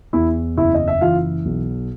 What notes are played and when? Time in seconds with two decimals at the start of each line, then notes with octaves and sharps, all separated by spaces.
0.13 E2 E4 E5
0.57 F#1 E4 E5
0.74 D#5
0.88 E5
1.01 E3 F4 F5
1.45 B1